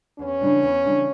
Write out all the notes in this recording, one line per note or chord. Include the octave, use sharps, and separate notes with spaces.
E2 C#4
C#3 E3 G3 D4
E2
C#3 E3 G3 D4